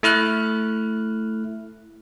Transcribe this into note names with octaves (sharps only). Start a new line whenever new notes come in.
A3 E4 F6 F#6